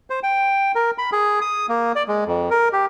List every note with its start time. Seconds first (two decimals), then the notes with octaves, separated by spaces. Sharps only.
0.10 C5
0.23 G5
0.75 A#4
0.98 B5
1.12 G#4
1.41 D#6
1.69 A#3
1.96 D5
2.08 G#3
2.27 F2
2.50 A#4
2.73 G4